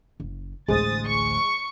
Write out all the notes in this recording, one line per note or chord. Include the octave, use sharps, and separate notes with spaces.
F#1
A1 D2 G#3 C5 D#6 A6
C#6